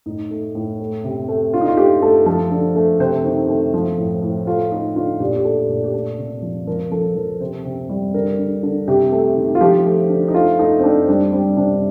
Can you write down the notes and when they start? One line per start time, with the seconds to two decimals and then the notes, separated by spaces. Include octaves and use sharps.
0.06 A2 D#4
0.31 A3
0.55 A2
0.80 A3
1.04 C3
1.29 A3
1.53 D3 F4
1.61 D#4
1.68 F4
1.77 A3 G4
2.02 A3 A4
2.26 F3 A4
2.51 D3
2.76 A3
3.00 C3 C5
3.25 D#3
3.49 A3
3.74 F3
3.98 A2
4.23 A2
4.47 A3 F4
4.72 A3 D#4
4.96 D3 F4
5.20 A#2 G4
5.36 G4
5.45 A3 A4
5.69 A#2
5.84 G4
5.94 A3 A4
6.18 C3
6.42 F3
6.67 F3 A#4
6.92 F3 A4
7.16 F3 A#4
7.41 C3 C5
7.65 C3
7.89 G3
8.14 D3 A#4
8.39 D3
8.63 D3
8.88 C3 G4
9.12 A3
9.36 D#3
9.55 F4
9.61 F3 G4
9.85 A3
10.10 D3
10.28 D#4
10.34 A3 F4
10.59 A3 D#4
10.79 C4
10.83 A3 D4
11.08 G3 D4
11.32 G3 C4
11.57 C3 D4